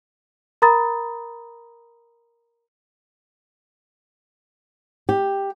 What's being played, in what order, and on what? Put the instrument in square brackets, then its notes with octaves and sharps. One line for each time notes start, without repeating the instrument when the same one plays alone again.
[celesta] A#4 A#5 B5 D#6 A6
[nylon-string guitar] G4